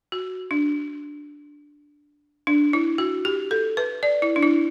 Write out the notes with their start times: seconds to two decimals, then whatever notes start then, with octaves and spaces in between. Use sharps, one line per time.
0.12 F#4
0.51 D4
2.47 D4
2.73 E4
2.98 F#4
3.25 G4
3.51 A4
3.77 B4
4.03 D5
4.22 E4
4.36 D4
4.43 E4